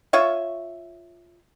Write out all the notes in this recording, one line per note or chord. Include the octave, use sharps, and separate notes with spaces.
F4 C#5 E5